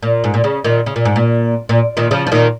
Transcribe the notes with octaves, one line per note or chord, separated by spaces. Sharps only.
A#2
G#2
A#2
C#3
A#2 D#3
C#3
A#2
G#2
A#2
A#2
A#2 D#3
C#3 F3
F3
A#2 D#3